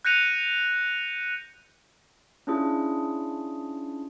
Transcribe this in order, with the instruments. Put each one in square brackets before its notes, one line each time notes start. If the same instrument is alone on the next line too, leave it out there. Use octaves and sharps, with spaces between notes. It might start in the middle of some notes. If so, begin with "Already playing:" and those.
[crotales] F#6 G6 A#6 C#7 D#7 F7
[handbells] C#4 D4 E4 F4 G#4